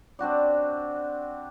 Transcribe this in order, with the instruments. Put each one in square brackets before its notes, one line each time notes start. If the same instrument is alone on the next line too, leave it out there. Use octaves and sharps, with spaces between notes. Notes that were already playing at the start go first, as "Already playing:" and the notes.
[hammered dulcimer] C4 D4 F#4 D5